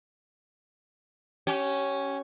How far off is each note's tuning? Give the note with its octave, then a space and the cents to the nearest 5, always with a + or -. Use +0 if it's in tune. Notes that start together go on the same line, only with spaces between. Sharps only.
C#4 +0 G4 -30